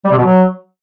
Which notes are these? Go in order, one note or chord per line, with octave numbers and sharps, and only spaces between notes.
G3
C3
B2
F#3